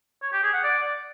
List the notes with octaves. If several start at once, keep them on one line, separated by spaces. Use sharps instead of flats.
C#5
G4
G#4
F#5
D5